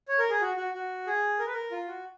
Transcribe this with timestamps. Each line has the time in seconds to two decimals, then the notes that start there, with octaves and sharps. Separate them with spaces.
0.08 C#5
0.19 A#4
0.30 G#4
0.42 F#4
0.57 F#4
0.74 F#4
1.07 G#4
1.39 A#4
1.47 B4
1.53 A#4
1.72 F4
1.87 F#4